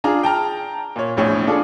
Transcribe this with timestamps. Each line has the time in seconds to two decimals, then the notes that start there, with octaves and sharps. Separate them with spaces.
0.04 D4 F4 G#4 A#5
0.23 G5 A5 A#5 F6
0.96 A#2 C#5
1.17 E1 A#1 A2 C#5
1.47 D4 F4 G#4 A4 D5